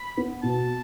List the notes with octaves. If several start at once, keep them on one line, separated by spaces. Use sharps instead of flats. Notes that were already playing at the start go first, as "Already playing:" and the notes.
Already playing: B5
B3
B2 A5